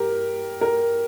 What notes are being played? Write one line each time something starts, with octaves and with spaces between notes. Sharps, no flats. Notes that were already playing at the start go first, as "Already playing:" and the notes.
Already playing: G3 G4 A#4
A#4